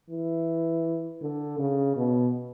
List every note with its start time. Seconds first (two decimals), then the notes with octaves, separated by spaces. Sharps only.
0.10 E3
1.22 D3
1.59 C#3
1.96 B2